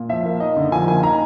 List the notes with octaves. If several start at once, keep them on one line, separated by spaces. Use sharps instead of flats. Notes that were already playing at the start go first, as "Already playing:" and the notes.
Already playing: A#2
F3 E5
A#3
D#4 D#5
D3
F3 G#5
A#3 G#5
D#4 A#5